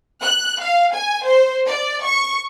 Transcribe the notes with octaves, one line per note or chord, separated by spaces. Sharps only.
F#6
F5
G#5
C5
D5
C#6